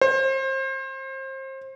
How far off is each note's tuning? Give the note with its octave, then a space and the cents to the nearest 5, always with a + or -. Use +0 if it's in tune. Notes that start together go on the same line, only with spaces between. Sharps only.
C5 +30